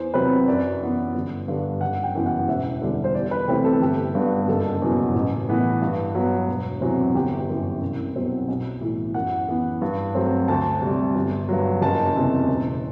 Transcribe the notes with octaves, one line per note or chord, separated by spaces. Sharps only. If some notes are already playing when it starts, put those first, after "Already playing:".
Already playing: E2 C5
C3 F#3 C4 B4
F#2 D5
E3 B3
G1
G2 D3 G3
F#1 F#5
G5
F#2 E3 B3
F#5
E1 E5
E2 D3 G3
C5
E2 D5
B4
C3 E3 A3 C4 G4
A4
G1 G4
G2 D3 G3 B3
F#1 A4
E2 B2 F#3
A1
A2 E3 B3
G2
F#3 B3
E1
E2 C3 F#3 C4
G1 G4
F#2 E3
C2
B2 F#3 C4
B1
A2 E3
F#2 F#5
E3 B3
G2
F#3 A3 C4
D2 A5
C3 G3
G1
G2 F#3
F#1 A5
E2 C3
E1